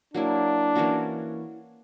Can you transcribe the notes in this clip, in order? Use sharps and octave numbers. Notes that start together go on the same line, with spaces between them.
F#3 A#3 D4 E4
E3 A#3 C#4 F#4